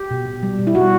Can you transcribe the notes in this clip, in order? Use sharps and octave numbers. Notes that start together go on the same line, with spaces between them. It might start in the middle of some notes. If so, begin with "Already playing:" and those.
Already playing: G4
B2
B2
G3
B2
E4
G3 F#4